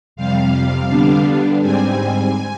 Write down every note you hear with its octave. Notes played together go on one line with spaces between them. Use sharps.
F2 C3 G3 F5
D3 G3 B3 D4
G#2 G3 C4 G#5